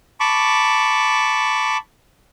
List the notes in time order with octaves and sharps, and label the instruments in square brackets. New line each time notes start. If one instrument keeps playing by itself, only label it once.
[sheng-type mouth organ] A5 B5 C#6 D6